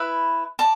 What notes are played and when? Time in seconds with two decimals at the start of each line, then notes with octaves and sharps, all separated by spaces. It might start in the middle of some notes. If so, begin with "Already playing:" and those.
Already playing: E4 B4 E5 B5
0.59 D5 A5